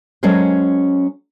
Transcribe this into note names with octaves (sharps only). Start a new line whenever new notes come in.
F#3 G#3 C#4 A4 A#4 C5